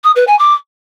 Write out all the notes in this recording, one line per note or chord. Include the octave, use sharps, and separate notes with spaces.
D#6
B4
G#5
D6